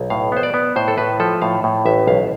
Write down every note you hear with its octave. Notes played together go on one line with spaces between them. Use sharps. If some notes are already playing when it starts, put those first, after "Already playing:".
Already playing: B1
A2 F5
B3 C5
D5
B3
A2 C5
A4
A2 B4
F3 A4
A2 F5
A2
A1 E5
B1 F5